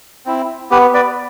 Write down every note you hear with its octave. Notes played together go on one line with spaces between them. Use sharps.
C4 E4
B3 G4 B4
B4 D5